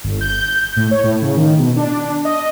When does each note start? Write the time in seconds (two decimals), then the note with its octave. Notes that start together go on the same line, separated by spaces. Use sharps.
0.04 G1
0.21 G6
0.77 A2
0.91 C#5
1.04 A2
1.22 C#3
1.36 D#3
1.58 B2
1.77 D4
2.25 D#5